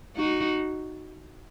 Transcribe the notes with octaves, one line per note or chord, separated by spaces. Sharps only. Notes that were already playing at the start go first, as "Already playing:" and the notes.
D#4 F#4